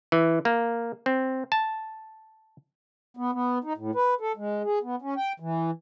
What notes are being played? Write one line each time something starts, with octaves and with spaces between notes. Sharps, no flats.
E3
A#3
C4
A5
B3
B3
D#4
A2
B4
A4
G#3
G#4
B3
C#4
G5
E3